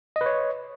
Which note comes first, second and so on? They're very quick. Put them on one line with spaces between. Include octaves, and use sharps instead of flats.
D#5 B4 C#5